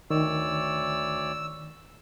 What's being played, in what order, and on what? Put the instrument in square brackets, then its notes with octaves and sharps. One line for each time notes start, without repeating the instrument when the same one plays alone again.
[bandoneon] D2 C#5 D5 [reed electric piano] D#3 [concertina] E6